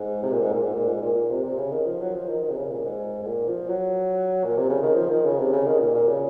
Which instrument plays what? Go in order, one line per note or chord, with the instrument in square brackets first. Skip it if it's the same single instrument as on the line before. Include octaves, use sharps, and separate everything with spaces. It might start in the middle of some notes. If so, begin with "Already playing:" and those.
Already playing: [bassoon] G#2
C3
A#2
G#2
A#2
G#2
A#2
G#2
A#2
A#2
C3
C3
C#3
D#3
F3
F#3
F3
D#3
D#3
C3
C#3
A#2
G#2
G#2
A#2
F3
F#3
A#2
C3
C#3
D#3
F3
D#3
C#3
C3
C#3
D#3
A#2
A#2
C#3